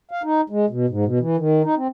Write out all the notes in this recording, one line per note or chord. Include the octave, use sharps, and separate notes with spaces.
F5
D#4
G#3
B2
G#2
B2
E3
D#3
D#4
C4